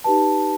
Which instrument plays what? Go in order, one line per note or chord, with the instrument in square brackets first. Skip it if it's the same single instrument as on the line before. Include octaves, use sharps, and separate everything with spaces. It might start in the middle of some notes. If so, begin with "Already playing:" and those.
[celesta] D#4 G4 B4 A5